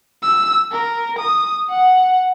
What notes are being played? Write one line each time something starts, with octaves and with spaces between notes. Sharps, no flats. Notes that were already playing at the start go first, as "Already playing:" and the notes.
E6
A#4
D#6
F#5